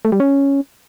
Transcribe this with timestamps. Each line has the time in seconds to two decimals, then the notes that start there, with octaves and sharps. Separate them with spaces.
0.05 A3
0.12 G3
0.20 C#4